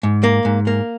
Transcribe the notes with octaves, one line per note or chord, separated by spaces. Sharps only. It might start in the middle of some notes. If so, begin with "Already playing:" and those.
G#2
A#3
G#2
A#3